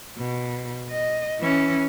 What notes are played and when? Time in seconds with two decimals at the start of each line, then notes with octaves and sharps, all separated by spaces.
0.18 B2
0.91 D#5
1.41 E3 C#4